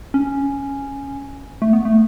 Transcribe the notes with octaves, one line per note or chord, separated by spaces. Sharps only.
C#4
A3
B3
A3